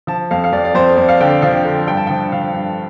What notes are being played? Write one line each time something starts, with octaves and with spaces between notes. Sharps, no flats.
F3 A5
F2 F5
F5
F2 D5
D5
F2 C5
F2 D5
F5
D3 G5
F3 F5
D3
G2 G5
A5
G5
F3
F3 F5
G2